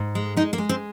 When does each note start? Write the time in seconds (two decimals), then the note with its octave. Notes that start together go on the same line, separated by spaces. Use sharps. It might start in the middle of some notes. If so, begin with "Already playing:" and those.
Already playing: G#2
0.15 G#3
0.37 G#3 D#4
0.53 A#3
0.58 G#3
0.69 C4